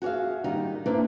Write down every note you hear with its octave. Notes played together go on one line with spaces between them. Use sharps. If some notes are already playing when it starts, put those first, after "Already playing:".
F#4 G#4 C#5 E5 F5
D#3 G3 D#4
A#3 C4 D4 E4 B4 D5